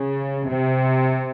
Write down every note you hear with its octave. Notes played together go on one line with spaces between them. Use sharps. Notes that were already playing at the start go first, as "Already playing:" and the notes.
Already playing: C#3
C3